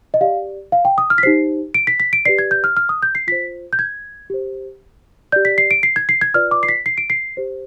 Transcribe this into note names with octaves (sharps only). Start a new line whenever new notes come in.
D#5
G4 D5 F5
F5
G5
D#6
F6
B6
D#4 G4 C5 C7
D7
B6
B6
D7
G4 B4 D5 C7
G#6
G6
F6
F6
D#6
G6
C7
F4 C5 B6
G6
G#6
G4 C5
G4 D5 G6
B6
C7
D7
C7
G#6
C7
G#6
F4 B4 D5 F6
D6
C7
B6
C7
D7
C7
G4 C5